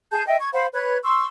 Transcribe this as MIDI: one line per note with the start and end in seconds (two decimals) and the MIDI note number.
0.12 0.25 68
0.12 0.25 81
0.12 0.25 91
0.27 0.36 75
0.27 0.36 76
0.27 0.36 79
0.41 0.49 85
0.41 0.49 92
0.53 0.66 72
0.53 0.66 77
0.53 0.66 78
0.53 0.66 83
0.74 0.98 71
0.74 0.98 73
0.74 0.98 90
0.74 0.98 92
1.03 1.26 84
1.03 1.26 85
1.03 1.26 88